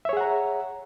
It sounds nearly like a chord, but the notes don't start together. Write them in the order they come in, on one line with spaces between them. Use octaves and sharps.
E5 C#5 G#4 F#5 A#5